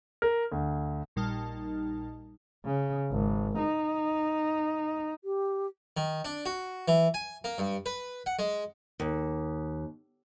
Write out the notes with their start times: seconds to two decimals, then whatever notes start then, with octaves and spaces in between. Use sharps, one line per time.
0.22 A#4
0.52 D2
1.16 A#1 A#2 G3 D#4 A5 F6
2.65 C#3
3.11 G#1
3.58 D#4
5.24 G4
5.97 D#3
6.25 D4
6.46 F#4
6.88 E3
7.14 G#5
7.44 A#3
7.58 G2
7.86 B4
8.26 F#5
8.39 G#3
9.00 D#2